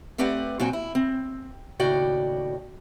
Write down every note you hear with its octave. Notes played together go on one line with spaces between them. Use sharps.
A3 C4 G4 B4 D5 F#5
A#2 F#3 C4 F#4 G5 G#5
E4
C4
D#2 A2 C#3 F#4 D5 G5